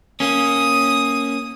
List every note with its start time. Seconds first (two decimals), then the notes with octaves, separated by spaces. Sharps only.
0.20 A#3 C#4 D#6